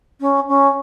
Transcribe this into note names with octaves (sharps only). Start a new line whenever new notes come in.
C#4
C#4